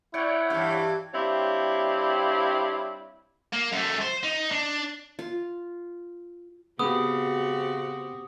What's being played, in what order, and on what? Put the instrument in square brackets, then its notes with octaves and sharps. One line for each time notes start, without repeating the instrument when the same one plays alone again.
[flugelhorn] E4 [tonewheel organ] C#5 F#5 G5 [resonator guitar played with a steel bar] D5
[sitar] G2 E3 [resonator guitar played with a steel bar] F5
[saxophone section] G3 C4 D4 E4 C#5 F5
[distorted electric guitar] A#3
F#2 A3
C5
D#4
D4
[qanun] F4
[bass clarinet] C#3 [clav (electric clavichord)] B3 [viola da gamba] C4 F#4 G4 [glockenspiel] D#6